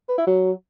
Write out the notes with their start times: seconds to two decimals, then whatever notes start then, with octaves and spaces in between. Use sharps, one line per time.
0.09 B4
0.18 E4
0.26 F#3